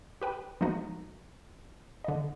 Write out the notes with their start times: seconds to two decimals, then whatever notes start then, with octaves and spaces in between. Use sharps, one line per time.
0.21 G4 B4 G5
0.61 F3 G#3 B3 D#4 F#4
2.04 D3 D#5